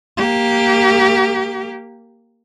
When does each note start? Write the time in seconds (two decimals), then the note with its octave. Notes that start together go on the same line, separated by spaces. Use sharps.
0.17 A#3 G4